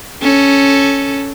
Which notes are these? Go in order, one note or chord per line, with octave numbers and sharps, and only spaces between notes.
C#4 A4